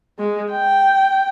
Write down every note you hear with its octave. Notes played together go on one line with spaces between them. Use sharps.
G#3
G5